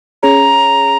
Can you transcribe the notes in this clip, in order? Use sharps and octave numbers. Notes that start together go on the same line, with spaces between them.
C#4 G#4 C#5 A#5